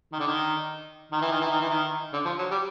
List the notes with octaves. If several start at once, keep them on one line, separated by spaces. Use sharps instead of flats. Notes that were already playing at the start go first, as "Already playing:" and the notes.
D#3
D3
D#3
D#3
E3
D#3
E3
D#3
E3
D#3
D3
F3
F#3
G3